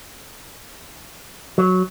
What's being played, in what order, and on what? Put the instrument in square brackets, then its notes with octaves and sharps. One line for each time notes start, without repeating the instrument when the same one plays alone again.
[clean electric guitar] F#3